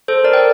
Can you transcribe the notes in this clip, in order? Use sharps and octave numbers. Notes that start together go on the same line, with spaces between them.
A4 C5
A#4 D5
G5